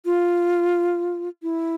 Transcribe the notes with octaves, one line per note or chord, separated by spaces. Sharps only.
F4
E4